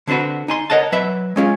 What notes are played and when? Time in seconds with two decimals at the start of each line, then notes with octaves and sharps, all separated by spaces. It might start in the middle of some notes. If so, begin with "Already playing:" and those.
0.07 D3 C4 D4 F#4 B4
0.48 D#4 G#5 C6
0.70 A#4 C#5 D#5 F#5 A5
0.92 F#3 B4 E5
1.36 G#3 C#4 F4